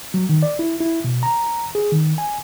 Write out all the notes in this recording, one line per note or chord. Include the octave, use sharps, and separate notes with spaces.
F#3
D#3
D5
E4
E4
B2
A#5
G#4
D#3
G#5